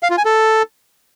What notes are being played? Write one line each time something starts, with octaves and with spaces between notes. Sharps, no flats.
F5
F4
G#5
A4